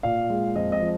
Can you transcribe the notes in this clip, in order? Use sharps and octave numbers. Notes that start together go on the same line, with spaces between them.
A#2 D5 F5
G#3
F2 D#5
D#5
F3